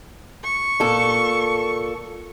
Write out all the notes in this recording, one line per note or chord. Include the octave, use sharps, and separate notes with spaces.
C#6
A#2 A4